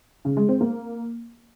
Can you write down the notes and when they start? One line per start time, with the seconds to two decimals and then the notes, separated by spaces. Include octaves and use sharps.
0.25 C#3
0.37 G#3
0.49 C4
0.61 A#3